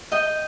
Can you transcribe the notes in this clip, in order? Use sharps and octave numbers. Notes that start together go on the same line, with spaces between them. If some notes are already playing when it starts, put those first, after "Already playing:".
D#5 G5